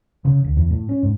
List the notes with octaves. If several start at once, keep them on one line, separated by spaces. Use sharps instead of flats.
C#3
D2
E2
A2
C#4
G#2